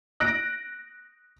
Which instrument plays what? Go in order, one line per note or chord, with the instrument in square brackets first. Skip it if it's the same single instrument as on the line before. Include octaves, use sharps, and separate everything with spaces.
[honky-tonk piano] F#6 A#6 D7